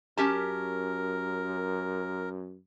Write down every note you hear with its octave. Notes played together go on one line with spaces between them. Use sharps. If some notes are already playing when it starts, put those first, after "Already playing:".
F#2 C#4 G4 A#4 A5